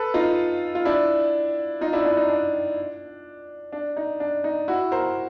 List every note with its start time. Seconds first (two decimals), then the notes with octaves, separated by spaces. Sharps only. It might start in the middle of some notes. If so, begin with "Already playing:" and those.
Already playing: A4 B4
0.14 D#4 F4
0.75 F4
0.85 D4 E4
1.81 D#4 F4
1.93 D4 E4
2.05 D4 E4
2.17 D#4
2.29 D4
3.73 D4
3.97 D#4
4.20 D4
4.44 D#4
4.68 E4 F#4
4.92 A#4 C5